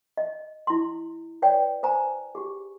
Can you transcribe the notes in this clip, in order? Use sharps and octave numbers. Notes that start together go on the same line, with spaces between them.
D#5
E4 C6
B4 C#5 D5 G5
C5 G#5 A#5
G4 G#4